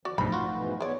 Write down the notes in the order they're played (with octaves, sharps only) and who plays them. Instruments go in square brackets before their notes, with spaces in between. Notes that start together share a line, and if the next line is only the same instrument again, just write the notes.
[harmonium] F2 D#3 F3 [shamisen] F#4 [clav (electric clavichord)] D5
[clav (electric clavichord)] B1 G2 [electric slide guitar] F3 A3 D#4 [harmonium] C5 [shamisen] B5
[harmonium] A#2 [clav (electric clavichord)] F4 F#4
[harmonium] G#2 B2 E3
[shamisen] G#3 D5 [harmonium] B3 C#5